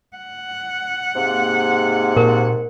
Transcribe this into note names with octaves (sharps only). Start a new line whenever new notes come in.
F#5
G#2 C3 A#3
A#2 A#4